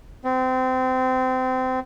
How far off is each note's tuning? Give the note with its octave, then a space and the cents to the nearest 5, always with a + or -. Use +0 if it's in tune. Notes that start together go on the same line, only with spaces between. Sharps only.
C4 -25